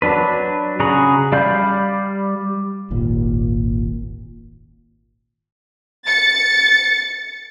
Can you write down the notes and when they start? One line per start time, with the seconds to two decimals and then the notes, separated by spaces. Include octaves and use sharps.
0.02 F#3 D4 B4
0.80 C#3 F#4 G#4 A#5 B5
1.32 G3 D5 F5 B5 G6
2.90 D#1 G#1 D#2 A#2
6.06 A6 C#7